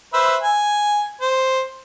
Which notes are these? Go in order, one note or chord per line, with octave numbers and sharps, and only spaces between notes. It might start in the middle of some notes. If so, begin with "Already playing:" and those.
B4 C5 E5
G#5
C5